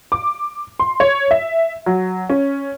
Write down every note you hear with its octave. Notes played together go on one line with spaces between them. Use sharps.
D6
C6
C#5
E5
F#3
C#4